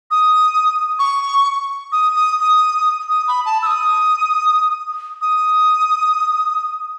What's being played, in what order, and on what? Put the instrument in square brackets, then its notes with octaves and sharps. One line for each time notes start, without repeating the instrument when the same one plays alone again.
[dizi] D#6
C#6
D#6
D#6
D#6
D#6
B5
A5
E6
D#6
D#6